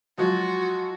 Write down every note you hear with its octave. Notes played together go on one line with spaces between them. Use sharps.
F3 F#3 G#3 F4 F#4